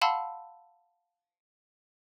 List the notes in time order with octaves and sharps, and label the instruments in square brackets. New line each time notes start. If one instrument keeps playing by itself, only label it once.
[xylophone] F5 F#5 A5 B5 C6 E6